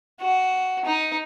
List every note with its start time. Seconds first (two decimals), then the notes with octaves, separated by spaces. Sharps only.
0.20 F#4
0.85 D#4